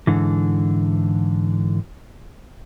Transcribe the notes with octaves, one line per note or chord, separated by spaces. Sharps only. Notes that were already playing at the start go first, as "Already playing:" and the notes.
G#2 D3 E3